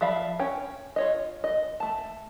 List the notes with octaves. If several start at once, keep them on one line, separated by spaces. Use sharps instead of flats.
F3 D5 E5 F5 B5
C#4 C#5 G5
F4 C#5 D#5
D#5
A3 A5